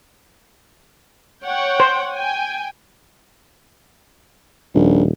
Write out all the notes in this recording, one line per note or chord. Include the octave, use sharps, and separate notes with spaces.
C#5 F#5 G5
C5
G5 G#5
D#1 A#1